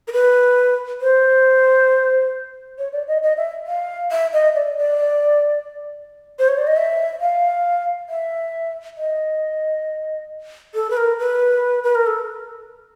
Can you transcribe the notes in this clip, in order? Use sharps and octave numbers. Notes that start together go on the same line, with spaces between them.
A#4
B4
C5
C#5
D5
D#5
D#5
E5
F5
E5
D#5
D5
D5
C5
C#5
D5
D#5
E5
F5
E5
D#5
A4
B4
A#4
B4
B4
A#4
A4